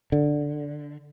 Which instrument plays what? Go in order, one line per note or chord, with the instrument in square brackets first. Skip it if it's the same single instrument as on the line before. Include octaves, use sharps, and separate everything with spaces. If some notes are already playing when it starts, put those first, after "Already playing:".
[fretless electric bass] D3